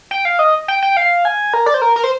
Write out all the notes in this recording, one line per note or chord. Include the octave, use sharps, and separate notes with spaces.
G5
F5
D#5
G5
G5
F5
G#5
A#4
D5
C5
A#4
A#4
C5